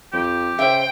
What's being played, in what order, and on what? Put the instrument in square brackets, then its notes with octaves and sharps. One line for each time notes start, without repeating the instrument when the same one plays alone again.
[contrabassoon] F2 [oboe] G4
[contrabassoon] C#3 [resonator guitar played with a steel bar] C5 E5 [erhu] G5